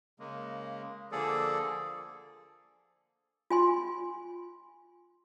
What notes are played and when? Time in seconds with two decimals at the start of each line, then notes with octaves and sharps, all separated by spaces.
0.19 C#3 G#3 A#3
1.12 D3 F3 A#3 G#4 A4 D5
3.50 F4 G#5 C6